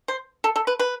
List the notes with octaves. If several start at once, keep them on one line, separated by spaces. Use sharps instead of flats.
C5
A4
A4
B4
B4